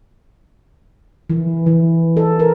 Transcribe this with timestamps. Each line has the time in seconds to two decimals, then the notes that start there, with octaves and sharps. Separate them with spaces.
1.30 E3
1.66 E3
2.17 A4
2.39 A#4